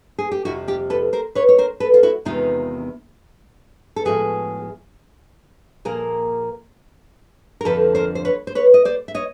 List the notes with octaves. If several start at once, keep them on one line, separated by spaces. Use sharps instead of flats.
G#4
G4
F2 C3 F3 E4 F#4
F4 G4
A4 B4
A#4 C5
B4 C#5
C#5
A#4 C5
A4 B4
F4
E4 F#4
E2 C3 D#3 G#3 B3 D#4 F4
A4
A2 F3 G#3 B3 F#4 G#4
A#2 F3 A#3 G#4 A#4
A#4
F2 D3 F3 A4 B4
A#4 C5
C5
B4 C#5
C5
B4 C#5
D#5
C5 D5
E5
C#5 D#5